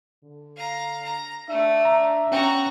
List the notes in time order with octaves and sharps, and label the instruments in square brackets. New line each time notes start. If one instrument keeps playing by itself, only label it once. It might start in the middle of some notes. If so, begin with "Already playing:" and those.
[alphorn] D3
[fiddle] F5 A#5
A#5
[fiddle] A3 [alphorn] D4 [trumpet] E5
[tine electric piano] A#5
[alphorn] B3 [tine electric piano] C#4 G5 [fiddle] F#4 A#5